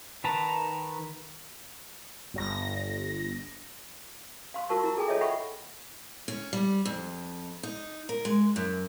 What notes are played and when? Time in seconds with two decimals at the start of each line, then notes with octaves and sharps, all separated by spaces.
0.24 D#3 B4 A5 A#5
2.34 G1 A#6
4.54 F5 C6
4.69 F4 F#4 A#4 A5 C#6
4.84 E4 A#5
4.97 G#4 A4 G5 G#5
5.08 F4 A4 C#5 D#5 E5
5.21 A4 E5 F#5 G5 B5 C#6
6.28 C#4
6.53 G3
6.85 F2
7.63 D#4
8.09 A#4
8.25 G#3
8.56 F#2